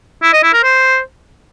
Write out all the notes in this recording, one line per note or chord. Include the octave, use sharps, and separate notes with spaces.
E4
D#5
E4
A#4
C5